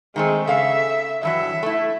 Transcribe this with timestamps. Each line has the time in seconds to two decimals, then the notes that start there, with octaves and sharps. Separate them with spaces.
0.16 D#3 G#3 A3 C4
0.47 C#3 A4 E5 F5
1.23 G2 E3 F#3 E5
1.63 A3 E4